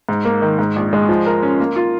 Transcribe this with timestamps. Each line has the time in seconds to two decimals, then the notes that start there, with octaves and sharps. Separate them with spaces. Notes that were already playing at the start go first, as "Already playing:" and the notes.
0.09 G#2
0.25 A#3
0.42 D#3
0.59 G#2
0.76 A#1
0.93 G#3
1.09 F3
1.26 A#4
1.43 C#4
1.60 A#3
1.76 F4